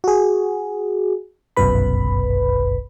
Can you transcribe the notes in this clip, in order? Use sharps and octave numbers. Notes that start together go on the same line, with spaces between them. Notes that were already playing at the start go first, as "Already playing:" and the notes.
F#4 G#4
G1 C2 F#2 B2 B4 B5